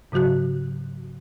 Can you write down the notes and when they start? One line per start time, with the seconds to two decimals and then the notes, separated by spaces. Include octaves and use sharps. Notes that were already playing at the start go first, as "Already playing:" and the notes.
0.12 G#2 C#3 F#3 F#4 F#6